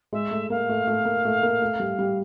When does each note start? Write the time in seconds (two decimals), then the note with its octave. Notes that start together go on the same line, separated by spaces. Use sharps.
0.13 G#3 E5
0.31 A3
0.50 A#3 F5
0.69 A3
0.88 A3
1.05 A#3
1.25 A3
1.43 A#3
1.62 A3
1.80 G3
1.99 G3